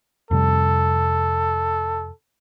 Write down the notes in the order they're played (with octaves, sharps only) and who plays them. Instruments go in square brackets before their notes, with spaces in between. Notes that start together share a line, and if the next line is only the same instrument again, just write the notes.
[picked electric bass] F2 C3 G3 [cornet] A4